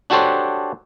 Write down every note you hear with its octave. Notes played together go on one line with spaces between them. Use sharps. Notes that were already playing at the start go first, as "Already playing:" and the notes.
D4 F#4 G4 A4 C5 C#5